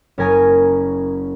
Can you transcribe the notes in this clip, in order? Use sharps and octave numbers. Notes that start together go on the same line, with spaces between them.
F#1 C#4 A#4 G#5 A#5 D#6